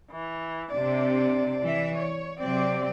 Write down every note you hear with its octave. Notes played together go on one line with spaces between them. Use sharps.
E3
C3 D4 D5
E3 E5
C#5
C3 F#3 C4 D5